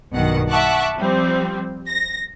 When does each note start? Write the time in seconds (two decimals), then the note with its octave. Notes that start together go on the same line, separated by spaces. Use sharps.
0.12 B1 G2 B2 D#3 F#5
0.49 E5 F#5 A5 C#6 D6 F#6
0.96 F3 G3 C4
1.88 A#6